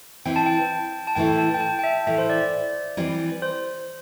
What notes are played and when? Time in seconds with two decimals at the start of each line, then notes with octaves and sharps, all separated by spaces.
0.25 E3 C4 E4 G5
0.36 A5
0.46 G5
1.07 A5
1.15 A2 E3 A3 E4 A4 G5
1.39 A5
1.54 G5
1.61 A5
1.79 G5
1.84 E5
2.07 A2 E3 A3 E5
2.18 C5
2.30 D5
2.97 E3 G3 C4
3.42 C5